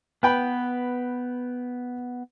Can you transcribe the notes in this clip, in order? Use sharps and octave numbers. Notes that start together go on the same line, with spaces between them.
B3 B4 G5 B5